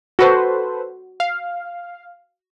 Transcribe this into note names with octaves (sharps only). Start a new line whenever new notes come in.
F#4 A4 B4 C5
F5